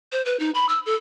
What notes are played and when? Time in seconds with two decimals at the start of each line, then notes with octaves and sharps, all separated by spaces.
0.12 C5
0.25 B4
0.40 D#4
0.55 B5
0.69 E6
0.86 A4